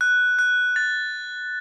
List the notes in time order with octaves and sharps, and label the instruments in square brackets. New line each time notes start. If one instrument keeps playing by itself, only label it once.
[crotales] F#6
F#6
A6